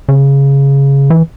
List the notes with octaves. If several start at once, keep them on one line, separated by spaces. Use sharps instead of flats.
C#3
E3